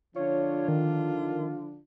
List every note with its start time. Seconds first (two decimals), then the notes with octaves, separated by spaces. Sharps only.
0.16 D3 F3 D4 F4 C#5
0.68 D#3